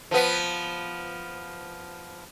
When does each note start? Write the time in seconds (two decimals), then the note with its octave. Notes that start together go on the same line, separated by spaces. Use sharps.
0.11 F3 B3